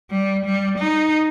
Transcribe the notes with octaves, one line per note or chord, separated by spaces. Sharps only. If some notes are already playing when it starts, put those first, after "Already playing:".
G3
G3
D#4